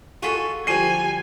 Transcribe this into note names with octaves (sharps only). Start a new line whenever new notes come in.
F4 F#4 G#4 A4 B5
D3 F3 G3 G#5 C7 D#7